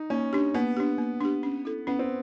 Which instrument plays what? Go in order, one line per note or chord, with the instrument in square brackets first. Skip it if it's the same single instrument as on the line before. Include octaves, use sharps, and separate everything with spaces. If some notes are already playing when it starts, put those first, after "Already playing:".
Already playing: [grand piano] D#4
[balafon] A#3 [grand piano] C#4
[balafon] D4 G4
[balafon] A#3 [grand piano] B3
[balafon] D4 G4
A#3
D4 G4
C#4
E4 A4
[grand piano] B3 [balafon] C#4
[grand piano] C4